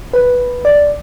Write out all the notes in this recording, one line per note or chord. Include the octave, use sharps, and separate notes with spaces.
B4
D5